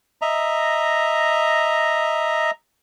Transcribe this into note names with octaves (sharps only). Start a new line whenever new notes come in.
D#5 E5 A#5